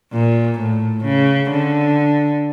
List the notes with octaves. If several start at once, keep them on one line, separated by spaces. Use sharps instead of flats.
A#2
A2
C#3
D3